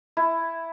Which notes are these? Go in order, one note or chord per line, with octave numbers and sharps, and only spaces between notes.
E4